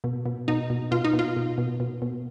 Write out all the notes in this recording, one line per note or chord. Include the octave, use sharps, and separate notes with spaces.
B2
B2
B2 D#4
B2
B2 F4
D#4
B2
F4
B2
B2
B2
B2